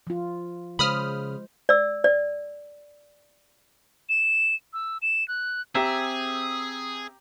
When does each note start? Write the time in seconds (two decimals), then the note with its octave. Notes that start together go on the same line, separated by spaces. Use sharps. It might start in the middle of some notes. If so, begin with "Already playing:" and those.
0.07 F3 F4
0.79 C#3 G#3 C5 B5 D#6 F6
1.69 D5 E6
2.04 D5
4.09 E7
4.73 E6
5.02 E7
5.28 F#6
5.75 C4 G4 G#4 E5 G5 A#5